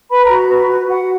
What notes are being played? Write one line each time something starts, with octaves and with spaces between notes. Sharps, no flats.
B4 B5
A#5
F#4
B4
F#4
F#4 F#5